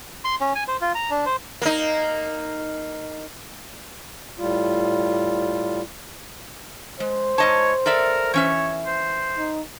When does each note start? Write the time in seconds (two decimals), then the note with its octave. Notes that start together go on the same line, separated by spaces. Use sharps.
0.25 C6
0.41 C#4
0.55 G#5
0.68 C5
0.81 F4
0.95 A#5
1.10 D4
1.26 C5
1.62 A#3 D#4
4.39 A2 G3 F4
7.00 G#3 C5
7.38 G#2 C#5 D#5 A5
7.86 A4 A#4 D5 E5
8.34 E3 C#4 C#5 E5
8.87 C5
9.38 D#4